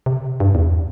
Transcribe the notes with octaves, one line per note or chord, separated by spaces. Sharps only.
C3
G2
E2